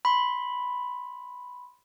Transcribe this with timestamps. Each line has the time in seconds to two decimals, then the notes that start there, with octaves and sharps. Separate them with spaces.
0.05 B5 C6